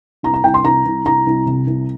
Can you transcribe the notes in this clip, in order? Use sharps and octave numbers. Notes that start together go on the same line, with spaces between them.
C2 A#5
A#5
C2 G5
C6
C2 A#5
C2
C2 A#5
C2
C3
C2